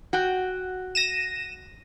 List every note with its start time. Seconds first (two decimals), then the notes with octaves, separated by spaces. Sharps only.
0.13 F#4 G5
0.95 A#6 D#7 E7